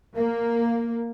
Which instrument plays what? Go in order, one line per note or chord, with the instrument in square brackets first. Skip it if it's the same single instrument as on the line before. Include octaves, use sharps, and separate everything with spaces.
[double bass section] A#3